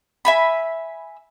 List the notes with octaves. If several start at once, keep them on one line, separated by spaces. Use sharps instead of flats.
E5 G#5 B5